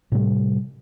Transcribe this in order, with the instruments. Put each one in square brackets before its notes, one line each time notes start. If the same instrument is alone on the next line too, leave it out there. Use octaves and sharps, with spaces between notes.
[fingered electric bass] A2 C3 G3